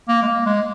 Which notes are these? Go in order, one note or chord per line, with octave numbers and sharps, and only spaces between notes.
A#3
G#3
A#3
G#3